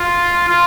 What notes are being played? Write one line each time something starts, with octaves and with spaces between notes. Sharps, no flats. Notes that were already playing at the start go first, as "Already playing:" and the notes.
Already playing: F4
F4